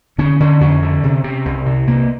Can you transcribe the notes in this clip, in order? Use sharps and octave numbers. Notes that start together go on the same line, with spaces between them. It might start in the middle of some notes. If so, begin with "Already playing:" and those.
D3 C#4
D3 C#4
F2 C#4
D3
C3
C3
C2
C3
C3 A#3